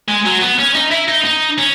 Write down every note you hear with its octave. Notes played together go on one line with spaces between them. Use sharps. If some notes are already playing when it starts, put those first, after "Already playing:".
G#3
F#3
B3
C#4
D#4
E4
D#4
D#4
C#4